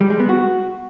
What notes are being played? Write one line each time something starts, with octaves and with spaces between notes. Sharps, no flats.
G3
G#3
B3
F#4